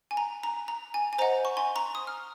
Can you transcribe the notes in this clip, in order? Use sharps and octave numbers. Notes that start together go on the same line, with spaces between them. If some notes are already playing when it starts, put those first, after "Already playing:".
G#5
A#5
A#5
A#5
G#5
G#5
C5 D#5 F#5 A#5
C#6
G#5 C6
A#5 C#6
D#6
F6